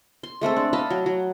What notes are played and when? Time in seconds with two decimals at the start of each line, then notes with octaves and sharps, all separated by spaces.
0.23 C6
0.41 G#3 A3 C4 A4
0.57 D4
0.73 D#5 F5 A5 B5
0.90 F#3
1.06 F#3